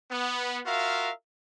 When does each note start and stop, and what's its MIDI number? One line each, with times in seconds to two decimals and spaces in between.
0.10 0.59 59
0.66 1.11 65
0.66 1.11 66
0.66 1.11 70
0.66 1.11 76
0.66 1.11 77